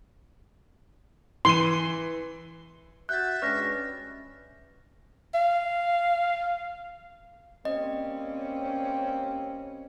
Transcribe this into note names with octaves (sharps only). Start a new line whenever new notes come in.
E3 C6 D#7
F#4 E5 F#6 G6 A6
G2 G#3 C#4 B4 D5 C#6 F6 A#6
F5
G3 A#3 C4 C#4 D#5